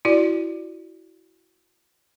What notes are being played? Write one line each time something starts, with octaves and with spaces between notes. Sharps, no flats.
E4 F#4 D5